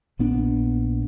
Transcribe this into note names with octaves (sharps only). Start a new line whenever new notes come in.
A#1 B3 D4